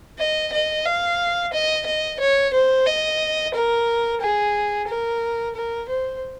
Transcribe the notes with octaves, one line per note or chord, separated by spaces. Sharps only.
D#5
D#5
F5
D#5
D#5
C#5
C5
D#5
A#4
G#4
A#4
A#4
C5